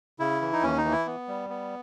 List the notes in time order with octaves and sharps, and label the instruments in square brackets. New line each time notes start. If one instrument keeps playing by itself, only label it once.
[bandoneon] C#3 E4
E3
D#4
D#2 C#4
D#4
E3
E4
B3
G3
B3